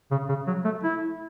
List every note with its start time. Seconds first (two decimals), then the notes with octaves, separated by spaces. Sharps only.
0.11 C#3
0.29 C#3
0.47 F#3
0.65 A3
0.83 E4